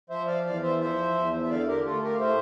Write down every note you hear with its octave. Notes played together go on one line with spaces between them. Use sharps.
F3 C5 E5
D5 F5
E2 D5 F5
C5 E5
F3 C5 E5
E2
E5
D3 D5 F5
G4 A#4
A3 F4 A4
G4 A#4
F5
A2 C5 E5